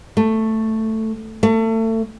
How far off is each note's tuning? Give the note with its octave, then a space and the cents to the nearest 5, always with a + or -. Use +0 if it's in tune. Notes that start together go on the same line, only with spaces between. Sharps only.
A3 +5
A3 +30